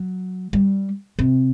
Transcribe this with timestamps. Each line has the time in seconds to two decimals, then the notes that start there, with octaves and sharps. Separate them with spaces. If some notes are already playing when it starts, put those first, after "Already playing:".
Already playing: F#3
0.53 G3
1.19 C3